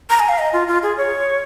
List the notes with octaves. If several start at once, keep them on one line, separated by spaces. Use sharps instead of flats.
A#5
G#5
F5
D#5
F4
F4
G#4
C#5